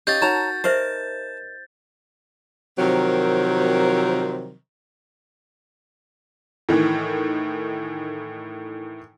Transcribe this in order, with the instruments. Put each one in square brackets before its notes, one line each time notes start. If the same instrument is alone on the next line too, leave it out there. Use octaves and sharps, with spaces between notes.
[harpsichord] C#4 D#4 G4 [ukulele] F5 [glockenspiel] G6 A6
[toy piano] D#4 [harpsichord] F#4 A#4 [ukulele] C#5 A5 A#5
[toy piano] G4 C5 E5 [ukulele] A#4 D#5 [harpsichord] A5
[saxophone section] C3 D#3 F3 F#3 C4 A#4
[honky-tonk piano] A2 D#3 E3